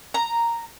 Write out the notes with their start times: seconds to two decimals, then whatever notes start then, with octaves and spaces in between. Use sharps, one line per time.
0.14 A#5